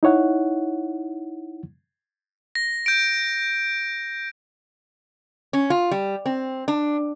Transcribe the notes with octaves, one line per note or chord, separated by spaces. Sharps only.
D#4 E4 C#5 F#5
A#6
G6 D7
C#4
F4
G3
C4
D4